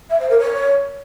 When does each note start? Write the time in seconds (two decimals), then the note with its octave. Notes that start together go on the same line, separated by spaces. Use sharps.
0.10 E5
0.19 C5
0.29 A#4
0.39 C#5